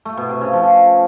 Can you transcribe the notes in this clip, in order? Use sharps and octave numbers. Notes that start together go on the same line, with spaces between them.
A3
B2
C3
C#3
F3